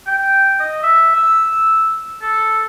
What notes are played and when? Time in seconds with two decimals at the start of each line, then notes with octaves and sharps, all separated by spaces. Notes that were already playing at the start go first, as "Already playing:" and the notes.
0.07 G5
0.60 D#5
0.83 E5
1.16 E6
2.22 A4